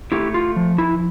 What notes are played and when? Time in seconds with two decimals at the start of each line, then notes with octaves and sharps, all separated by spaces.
0.12 A3 E4 G4
0.34 F4
0.56 F3
0.78 E4